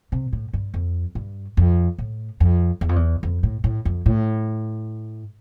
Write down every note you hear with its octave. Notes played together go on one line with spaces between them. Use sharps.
C3
A2
G2
F2
G2
F2
A2
F2
E2
F2
E2
F2
A2
A2
F2
A2